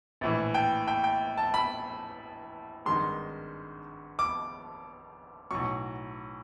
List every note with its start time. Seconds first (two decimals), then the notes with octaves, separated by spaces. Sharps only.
0.21 A#1 A2 E3
0.54 G5
0.87 G5
1.04 G5
1.37 A5
1.54 B5
2.86 G#1 G2 D#3 G#3 C6
4.19 D6
5.51 B1 A2 F#3 C#6